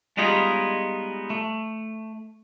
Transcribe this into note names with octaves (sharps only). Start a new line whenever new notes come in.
G3 G#3 B3 D#4 F4 G#4
A3